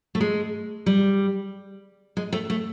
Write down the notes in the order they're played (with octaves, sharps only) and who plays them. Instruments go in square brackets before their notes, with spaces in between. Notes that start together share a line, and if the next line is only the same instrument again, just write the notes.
[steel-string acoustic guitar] A3
G#3
G3
G#3
A3
A3